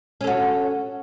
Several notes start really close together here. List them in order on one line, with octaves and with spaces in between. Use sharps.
C#4 A4 F#4